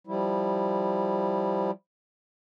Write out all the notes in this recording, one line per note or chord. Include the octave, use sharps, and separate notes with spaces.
F3 G3 E4